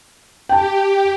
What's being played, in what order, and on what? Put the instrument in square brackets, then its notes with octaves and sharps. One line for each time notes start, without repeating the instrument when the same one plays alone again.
[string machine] G4 [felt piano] G5 A5